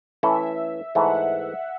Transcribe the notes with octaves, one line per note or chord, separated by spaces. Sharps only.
E3 A3 C#4 E4 A4 E5
G#2 E3 A3 F#5